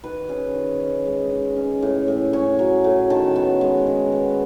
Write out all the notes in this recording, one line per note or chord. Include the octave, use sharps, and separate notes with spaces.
D#3 B4
C#4 G#4
D#3
C#4
G#3
D#3
C#4
A2
A2
C#4 C#5
F#3
A2
D#3 A5
B3
G#3
D#3
B3